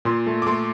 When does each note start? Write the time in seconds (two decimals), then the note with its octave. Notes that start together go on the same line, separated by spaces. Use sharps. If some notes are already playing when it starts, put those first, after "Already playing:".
0.05 A#2 C6
0.26 A3
0.42 D6
0.47 A3 C6